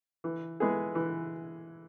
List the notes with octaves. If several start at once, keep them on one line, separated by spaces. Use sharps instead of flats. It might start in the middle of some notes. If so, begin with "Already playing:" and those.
E3
G#3 B3 E4 G#4
E3